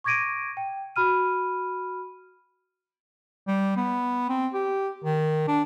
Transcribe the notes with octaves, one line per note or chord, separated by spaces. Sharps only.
C#6 D6 G#6 A#6 D7 D#7
G5
F#4 B5 F6 D#7
G3
B3
C4
G4
D#3
D4